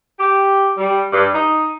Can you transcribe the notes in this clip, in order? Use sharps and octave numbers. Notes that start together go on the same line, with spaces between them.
G4
G3
G2
D#4